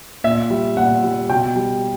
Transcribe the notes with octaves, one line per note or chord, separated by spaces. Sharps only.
A#2 E5
G3
A#2 F#5
G3
B2 G5
G3